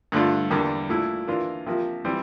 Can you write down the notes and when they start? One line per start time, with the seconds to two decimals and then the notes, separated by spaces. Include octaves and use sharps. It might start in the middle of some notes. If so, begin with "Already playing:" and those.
0.12 G2 D3 A3 D4 F4
0.50 E2 D3 G3 A#3 D4
0.89 A#2 A3 E4
1.27 E3 A#3 D4 F4
1.66 C3 F3 A#3
2.05 E3 G3 C4